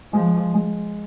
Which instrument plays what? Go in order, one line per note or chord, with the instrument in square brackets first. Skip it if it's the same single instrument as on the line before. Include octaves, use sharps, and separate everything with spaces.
[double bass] F3 [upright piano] G#3
[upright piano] G#3